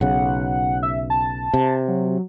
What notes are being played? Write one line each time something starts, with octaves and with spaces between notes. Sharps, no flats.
B1 C#3 F#5
E5
A5
C3
F#3